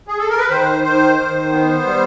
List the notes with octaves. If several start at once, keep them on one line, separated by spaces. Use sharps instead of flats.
G#4
A4
A#4
B4
D#3 C5
D#3 C5
D#3
B3
G3